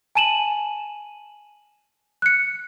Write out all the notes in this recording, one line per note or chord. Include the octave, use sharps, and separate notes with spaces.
G#5 A5 D#7 E7 F#7
F#6 C#7